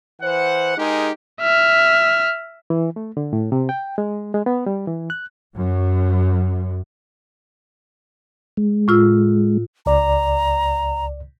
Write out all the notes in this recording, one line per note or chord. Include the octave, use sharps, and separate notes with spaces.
E3 C5 F#5
G#3 D#4 G4 G#4 A#4
E5 F6
E3
A3
D3
A2
C3
G5
G#3
G#3
B3
G3
E3
F#6
F#2
G#3
A2 F4 E6
C#2 D5 A#5